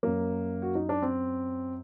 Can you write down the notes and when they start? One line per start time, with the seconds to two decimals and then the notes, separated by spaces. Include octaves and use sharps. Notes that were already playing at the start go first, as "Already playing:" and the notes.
0.03 F#2 F#3 A#3
0.62 F#4
0.75 D#4
0.89 D4
1.02 C4